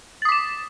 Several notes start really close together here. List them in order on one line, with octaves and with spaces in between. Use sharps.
A6 D#6 D6 E7